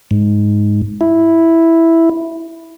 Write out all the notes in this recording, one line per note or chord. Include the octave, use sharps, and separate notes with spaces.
G#2
E4